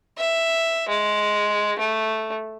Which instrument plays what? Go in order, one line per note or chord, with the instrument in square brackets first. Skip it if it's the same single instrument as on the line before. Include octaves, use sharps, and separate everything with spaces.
[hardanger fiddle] E5
G#3
A3